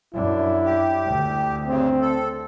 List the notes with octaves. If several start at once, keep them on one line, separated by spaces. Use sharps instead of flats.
F#2 D4 E4
G4
D2
G2 C#3 C4
A4